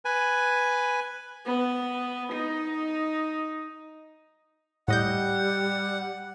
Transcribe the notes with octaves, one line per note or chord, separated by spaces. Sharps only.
B4 G#5
B3
D#4
A2 G3 D#5 F#5 G6